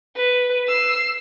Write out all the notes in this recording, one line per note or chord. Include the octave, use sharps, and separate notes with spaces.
B4
E6 C7